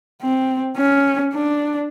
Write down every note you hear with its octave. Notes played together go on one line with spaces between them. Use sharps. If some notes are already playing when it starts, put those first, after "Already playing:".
C4
C#4
D4